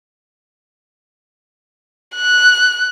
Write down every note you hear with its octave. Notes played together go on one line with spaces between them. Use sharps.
F#6